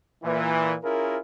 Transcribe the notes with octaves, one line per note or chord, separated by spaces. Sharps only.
A#2 E3
C#4 E4 F4 G#4 A#4